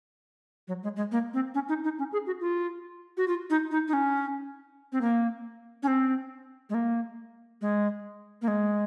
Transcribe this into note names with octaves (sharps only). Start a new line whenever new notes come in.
F#3
G#3
G#3
A#3
C4
C#4
D#4
D#4
C#4
G#4
F#4
F4
F#4
F4
D#4
D#4
D#4
C#4
C4
A#3
C#4
C4
G#3
A#3
G#3
A#3
G#3